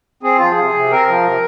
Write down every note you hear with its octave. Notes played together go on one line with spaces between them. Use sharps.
C4 G#4
F3 F4
G#4
C3
C3
C4 A#4
F3
C3